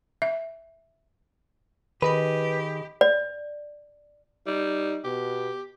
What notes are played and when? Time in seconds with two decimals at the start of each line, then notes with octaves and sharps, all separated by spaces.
0.22 E5
2.02 D#3 G4 G#4 B4 D#5 B5
3.01 D5
4.47 G3 D#4
5.04 B2 G4